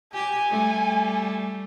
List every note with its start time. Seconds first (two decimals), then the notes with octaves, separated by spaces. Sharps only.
0.14 G4 G#5
0.50 G3 A3